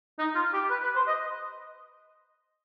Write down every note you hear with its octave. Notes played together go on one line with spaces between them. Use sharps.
D#4
F4
G4
B4
B4
C5
D#5